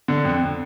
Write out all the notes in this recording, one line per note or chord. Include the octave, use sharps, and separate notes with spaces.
D3
F2